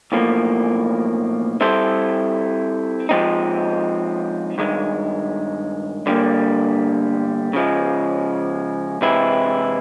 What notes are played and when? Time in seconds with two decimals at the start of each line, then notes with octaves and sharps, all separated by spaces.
0.12 B1 A2 F3 A#3
1.61 G3 C4 E4 A4 C5
3.09 F3 G#3 C4 D#4
4.58 G2 D#3 G#3
6.06 G2 D3 G3 A#3
7.53 C#3 F3 G#3
9.02 C3 E3 G#3 C4 E4